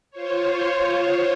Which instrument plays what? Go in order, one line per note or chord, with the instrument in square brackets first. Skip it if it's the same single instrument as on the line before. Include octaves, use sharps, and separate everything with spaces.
[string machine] F4 C5 C#5